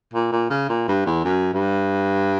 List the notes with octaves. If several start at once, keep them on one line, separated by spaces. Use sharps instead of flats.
A#2
A#2
C#3
A#2
G2
E2
F#2
G2